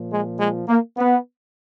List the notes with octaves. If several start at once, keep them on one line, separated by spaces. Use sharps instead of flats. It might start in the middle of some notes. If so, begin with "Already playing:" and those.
Already playing: A#2 F3
G#3
G#3
A#3
B3